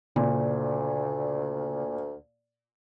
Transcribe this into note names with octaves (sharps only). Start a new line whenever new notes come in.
D2 A#2 C#3